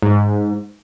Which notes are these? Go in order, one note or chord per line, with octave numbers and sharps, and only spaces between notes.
G#2